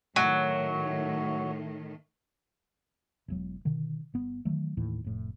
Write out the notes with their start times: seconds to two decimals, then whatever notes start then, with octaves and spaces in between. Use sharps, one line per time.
0.16 A2 D#3 F#3
3.28 E1 E2 F#3
3.65 B2 D3 D#3
4.14 G1 B3
4.45 D#3 E3 F#3 A3
4.77 D#2 A2 E3
5.04 F1 A2